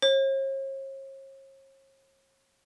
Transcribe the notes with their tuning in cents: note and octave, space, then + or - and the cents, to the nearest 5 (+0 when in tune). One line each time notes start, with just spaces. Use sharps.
C#5 -45